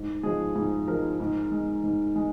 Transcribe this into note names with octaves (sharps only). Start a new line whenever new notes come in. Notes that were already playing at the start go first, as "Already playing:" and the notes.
Already playing: G#2
F3 G#3 G#4
G#2 G#4
F3 G#3 A#4
G#2
G#3
G#2
G#3